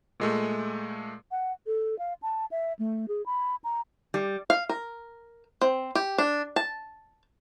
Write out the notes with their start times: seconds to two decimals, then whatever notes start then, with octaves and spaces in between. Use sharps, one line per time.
0.20 A#2 G#3 A3
1.31 F#5
1.67 A4
1.99 F5
2.22 A5
2.51 E5
2.79 A3
3.08 G#4
3.26 B5
3.64 A#5
4.14 G3
4.50 F5
4.69 A#4
5.61 C4
5.95 G4
6.18 D4
6.56 A5